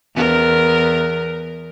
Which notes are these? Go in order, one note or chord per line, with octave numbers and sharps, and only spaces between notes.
E2 B3 A#4